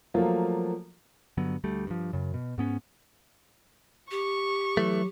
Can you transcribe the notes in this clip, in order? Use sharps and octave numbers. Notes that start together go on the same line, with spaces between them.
F3 F#3 A3 A#3 F4
G2 D3 F#3 B3
D2 G3 A3
G2 F3
F#2 C#3
B2
G#2 B3 C#4
G4 C#6
E3 F#3 A3